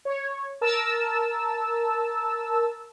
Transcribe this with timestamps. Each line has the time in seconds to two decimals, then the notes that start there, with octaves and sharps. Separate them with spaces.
0.05 C#5
0.61 A#4 A5 E6